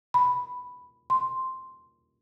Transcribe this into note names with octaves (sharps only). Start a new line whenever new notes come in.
B5
C6